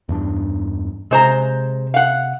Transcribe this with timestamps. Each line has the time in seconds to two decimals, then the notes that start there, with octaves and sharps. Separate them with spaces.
0.09 E2 G2 D4
1.11 C3 G#3 C5 A#5
1.94 F5 F#5